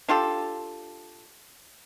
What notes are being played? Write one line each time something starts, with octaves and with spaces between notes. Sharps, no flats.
D4 F4 G4 A4